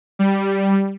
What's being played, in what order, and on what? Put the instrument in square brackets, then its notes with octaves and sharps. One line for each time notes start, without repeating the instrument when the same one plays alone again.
[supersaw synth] G3